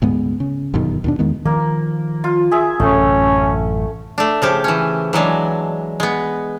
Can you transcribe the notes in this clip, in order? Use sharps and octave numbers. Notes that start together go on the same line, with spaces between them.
D2 G#2 G#3 B3
C#3
G1 F#2 B2 D#3
D#2 B2 D4
E2 D#3 G#3 B3
D#3 F3 A#3
F4
G#4 E5
A1 F#2 C3 A3 C#4
A3 D4
C#3 F3 G4
E3 C#4
E3 F#3 G#3 D4
G#3 B3